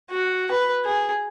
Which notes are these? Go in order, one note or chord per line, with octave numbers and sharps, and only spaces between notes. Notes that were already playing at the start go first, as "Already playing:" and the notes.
F#4
B4
G#4